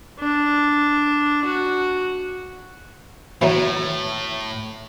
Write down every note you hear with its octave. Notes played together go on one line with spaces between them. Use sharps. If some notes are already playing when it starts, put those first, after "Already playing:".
D4
F#4
A2 E3 F#3 D#4